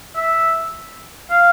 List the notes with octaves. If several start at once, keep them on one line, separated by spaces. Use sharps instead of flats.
E5
F5